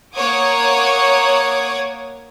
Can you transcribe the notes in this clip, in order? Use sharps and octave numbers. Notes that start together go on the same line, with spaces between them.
A#3 C#5 F#5 D6 D#6 G#6